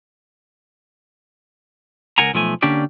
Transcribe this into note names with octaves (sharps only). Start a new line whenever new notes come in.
C#2 A#4 F#5 G#5 A#5
B1 F3 A3 G#5
D3 A#3 C#4 D4 G4 D5